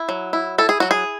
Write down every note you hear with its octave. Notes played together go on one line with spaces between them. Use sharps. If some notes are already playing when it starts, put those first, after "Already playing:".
Already playing: E4
F#3
E4
E4 A4
G#4
F#3 F#4
G#4